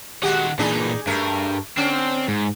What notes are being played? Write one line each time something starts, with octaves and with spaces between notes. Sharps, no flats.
D#3 G#3 F#4 G4 F#5
A#2 E3 D4 D#4 G#4
G2 A3 A#4
D3 C4 C#4
G#2